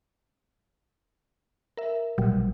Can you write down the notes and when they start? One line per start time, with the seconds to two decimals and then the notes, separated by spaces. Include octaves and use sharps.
1.77 A#4 E5
2.18 A#1 B2 F#3 G3